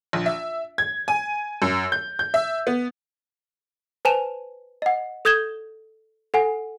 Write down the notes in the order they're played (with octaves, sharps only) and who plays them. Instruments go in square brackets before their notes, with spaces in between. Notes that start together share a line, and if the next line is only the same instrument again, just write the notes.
[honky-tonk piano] A#1
E5
G#6
G#5
F#2
G6
G6
E5
B3
[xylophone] B4 C5 G#5 A5 E7 F7
D#5 F#5
A4 D#6 G6 G#6 E7 G7
A4 F#5 G#5